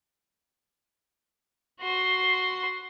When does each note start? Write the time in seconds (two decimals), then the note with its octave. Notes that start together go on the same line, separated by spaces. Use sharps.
1.81 F#4 C6